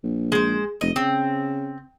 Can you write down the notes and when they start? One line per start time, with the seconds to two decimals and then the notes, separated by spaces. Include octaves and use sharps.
0.03 A#1
0.32 G#3 C5
0.81 F1 D#5
0.96 C#3 C4